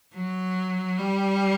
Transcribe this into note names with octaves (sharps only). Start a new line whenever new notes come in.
F#3
G3